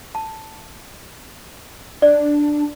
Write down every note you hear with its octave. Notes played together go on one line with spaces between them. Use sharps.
A5
D4 D5